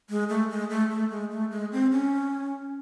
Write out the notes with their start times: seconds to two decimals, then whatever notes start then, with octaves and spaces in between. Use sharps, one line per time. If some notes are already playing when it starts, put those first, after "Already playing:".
0.10 G#3
0.29 A3
0.50 G#3
0.70 A3
0.91 A3
1.11 G#3
1.31 A3
1.51 G#3
1.72 C4
1.92 C#4